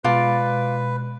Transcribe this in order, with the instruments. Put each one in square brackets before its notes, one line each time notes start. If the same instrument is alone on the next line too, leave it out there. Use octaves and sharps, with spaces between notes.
[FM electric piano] B2 G#3 [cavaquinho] F4 D5 A5 [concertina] B4